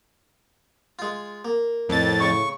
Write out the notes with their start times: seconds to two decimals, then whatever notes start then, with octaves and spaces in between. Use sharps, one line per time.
0.99 G#3 F4
1.45 A#3
1.89 F2 A2 A6
2.20 C#3 C#6